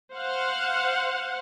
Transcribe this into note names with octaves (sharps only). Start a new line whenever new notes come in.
C5 F5 F#5